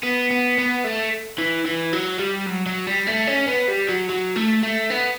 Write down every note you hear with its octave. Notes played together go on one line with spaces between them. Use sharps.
B3
B3
B3
A3
E3
E3
F#3
G3
F#3
F#3
G3
A3
C#4
B3
G3
F#3
F#3
A3
A3
B3